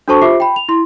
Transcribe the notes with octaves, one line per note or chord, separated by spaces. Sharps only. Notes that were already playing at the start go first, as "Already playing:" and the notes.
D4 F#4 A4 C5 A5 C#6
F4 G4 C5 E5 D6 C7
G5 B5
F7
E4 C6